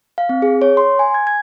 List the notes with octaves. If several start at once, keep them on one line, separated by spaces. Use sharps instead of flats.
F5
C4
G#4
C#5
C6
G#5
G#6
G#6